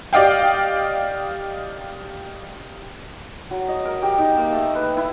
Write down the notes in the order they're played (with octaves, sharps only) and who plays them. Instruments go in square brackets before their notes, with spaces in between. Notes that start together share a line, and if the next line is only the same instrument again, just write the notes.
[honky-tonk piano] G4 D5 D#5 F5 G5
[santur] F#3
D#5
A#4
G4
D#4
A#3
A3
B4
E4